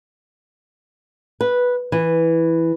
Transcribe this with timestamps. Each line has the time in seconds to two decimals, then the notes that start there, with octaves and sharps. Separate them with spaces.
1.41 B4
1.92 E3